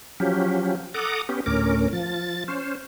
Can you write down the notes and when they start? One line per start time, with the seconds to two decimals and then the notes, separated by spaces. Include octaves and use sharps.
0.20 F3 F#3 C#4 G4
0.94 A4 F#5 A#5 D6 D#6
1.29 B3 C#4 G4
1.46 D2 A2 C#4 A#4 D6
1.93 F3 A6
2.48 C#4 C5